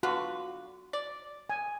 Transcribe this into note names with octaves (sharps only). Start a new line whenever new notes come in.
D3 F4 F#4 B4
D5
G#5